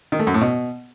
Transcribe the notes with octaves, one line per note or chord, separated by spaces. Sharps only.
D#3
A3
F#2
A2
B2